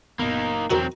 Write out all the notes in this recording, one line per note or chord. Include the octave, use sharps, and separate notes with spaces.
F#1 A#2 A#3 B3 D#4
E1 E2 F#3 C4 D#4 F#4 A#4